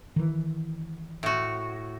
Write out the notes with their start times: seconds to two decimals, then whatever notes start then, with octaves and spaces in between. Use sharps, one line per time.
0.16 D#3 E3
1.23 A2 F#4